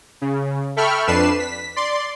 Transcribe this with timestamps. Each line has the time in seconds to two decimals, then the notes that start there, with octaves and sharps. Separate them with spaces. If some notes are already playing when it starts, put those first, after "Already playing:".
0.22 C#3
0.76 A4 E5 G5 B5 C#6 F6
1.07 F2 D4 B4 C7 E7
1.39 B6
1.76 D5 C6